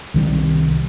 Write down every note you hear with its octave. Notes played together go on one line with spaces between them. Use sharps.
C2 D#3 G3